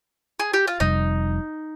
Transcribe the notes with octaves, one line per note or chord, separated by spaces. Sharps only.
G#4
G4
F4
F1 F2 C3 G3 D#4